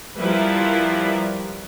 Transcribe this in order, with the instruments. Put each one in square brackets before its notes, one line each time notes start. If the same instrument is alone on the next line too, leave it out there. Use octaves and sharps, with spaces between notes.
[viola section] F3 G3 E4 A#4 B4 E5